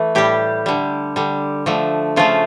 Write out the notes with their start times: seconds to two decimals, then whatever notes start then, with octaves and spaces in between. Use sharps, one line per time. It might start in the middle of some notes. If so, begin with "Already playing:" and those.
Already playing: E3 A3
0.15 A2 G3 G4
0.66 D3 G3
1.16 D3 G3
1.66 D3 F3 A3
2.16 C#3 F3 A3 F4